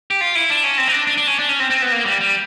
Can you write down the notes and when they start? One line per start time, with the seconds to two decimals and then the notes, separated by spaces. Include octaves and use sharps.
0.11 G4
0.21 F4
0.35 E4
0.50 D4
0.63 C#4
0.78 C4
0.88 D#4
0.92 D4
1.07 D4
1.17 D4
1.27 C#4
1.39 D4
1.49 C#4
1.60 C4
1.70 C4
1.82 B3
1.92 A#3
2.06 G3
2.21 G3